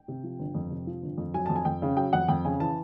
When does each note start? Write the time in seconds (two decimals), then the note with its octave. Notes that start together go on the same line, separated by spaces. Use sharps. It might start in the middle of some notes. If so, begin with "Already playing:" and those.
Already playing: G5
0.08 C3
0.24 F3
0.39 G1
0.55 F2
0.71 C3
0.87 F3
1.02 G1
1.18 F2
1.34 F#3 G#5
1.46 F2 A5
1.56 G#5
1.65 F2 G5
1.82 C#3
1.97 F#3 G5
2.13 F2 F#5
2.28 F2 G5
2.45 C#3 G#5
2.60 E3 A5